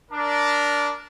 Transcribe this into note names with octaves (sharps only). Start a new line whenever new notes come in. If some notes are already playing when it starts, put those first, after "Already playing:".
D4 A#4